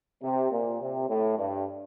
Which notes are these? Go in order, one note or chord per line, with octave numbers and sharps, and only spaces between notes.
C3
A#2
C3
A2
G2